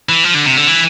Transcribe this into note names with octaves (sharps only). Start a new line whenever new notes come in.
E3
F3
D3
C3
D3
E3